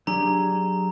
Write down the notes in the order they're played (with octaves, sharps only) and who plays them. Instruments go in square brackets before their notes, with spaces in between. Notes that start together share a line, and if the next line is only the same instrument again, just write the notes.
[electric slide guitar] F#3 G4 G#4 [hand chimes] D4 [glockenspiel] A#5